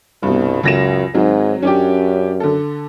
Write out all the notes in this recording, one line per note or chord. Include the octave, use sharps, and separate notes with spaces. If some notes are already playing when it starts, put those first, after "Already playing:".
C2 G2 B2
C#2 F#2 A#6 E7
G#2 D#3 F#3 C4
F#2 C#4 D4 G4
D3 A4